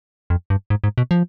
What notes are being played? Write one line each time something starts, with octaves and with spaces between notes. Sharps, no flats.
F2
G2
G#2
G#2
B2
F3